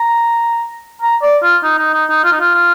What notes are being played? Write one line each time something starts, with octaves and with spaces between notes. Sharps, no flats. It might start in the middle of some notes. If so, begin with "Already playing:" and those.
Already playing: A#5
A#5
D5
F4
D#4
D#4
D#4
D#4
F4
D#4
F4
F4